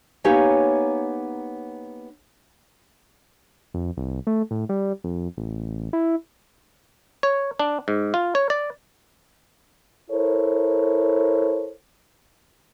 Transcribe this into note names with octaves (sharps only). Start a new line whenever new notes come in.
A#3 B3 D#4 G4 C#5 G#5
F2
C2
A3
A2
G3
F2
A1
E4
C#5
D4
G#2
F4
C#5
D5
E4 A4 A#4 C5 C#5